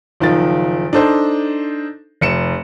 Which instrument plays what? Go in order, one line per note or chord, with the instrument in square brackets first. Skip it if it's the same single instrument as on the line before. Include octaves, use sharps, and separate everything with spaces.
[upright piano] F#1 D#3 F3 A6
D4 D#4 A4 C5
F1 C#7 E7